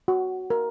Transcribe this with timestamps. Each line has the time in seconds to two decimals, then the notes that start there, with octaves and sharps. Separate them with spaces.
0.08 F#4
0.50 A#4